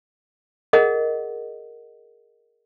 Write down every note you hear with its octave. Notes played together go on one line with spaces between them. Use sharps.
G#4 A#4 D#5 F#5